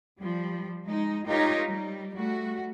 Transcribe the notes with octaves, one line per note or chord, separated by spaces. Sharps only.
F3 G3
G#3 D#4
D#4 F4 G4 A#4 C#5
G3
G3 A3 F#4